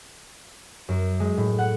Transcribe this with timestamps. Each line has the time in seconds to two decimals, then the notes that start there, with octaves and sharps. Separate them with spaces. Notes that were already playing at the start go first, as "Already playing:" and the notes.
0.88 F#2
1.20 G#3
1.37 A2
1.58 F#5